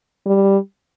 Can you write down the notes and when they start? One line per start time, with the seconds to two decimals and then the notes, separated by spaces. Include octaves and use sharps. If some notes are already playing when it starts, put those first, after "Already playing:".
0.26 G3